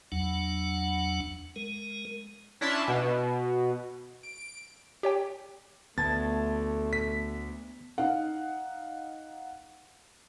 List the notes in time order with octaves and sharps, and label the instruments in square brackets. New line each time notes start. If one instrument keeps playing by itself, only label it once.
[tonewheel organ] E2 F#3 D4 F#5
G#3 A#4
[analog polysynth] C#4 D4 E4 E5 A5 C6
B2
D7
[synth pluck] G4 C#5 G5
[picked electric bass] D2 [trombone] A3 [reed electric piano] B3 A5 G#6 [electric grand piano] A6
[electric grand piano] B6
[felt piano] D#4 F5 F#5